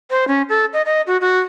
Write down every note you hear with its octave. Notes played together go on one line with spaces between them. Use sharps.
C5
C#4
A4
D#5
D#5
F#4
F#4